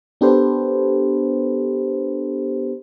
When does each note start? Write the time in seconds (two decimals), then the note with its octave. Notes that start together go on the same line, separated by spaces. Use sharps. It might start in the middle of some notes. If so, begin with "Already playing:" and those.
0.21 B3 D4 G4 A4 B4 C5